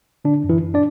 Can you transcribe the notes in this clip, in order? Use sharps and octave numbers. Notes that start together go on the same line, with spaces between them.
D3 D4
F#2
E3 E4
F#2
D4 D5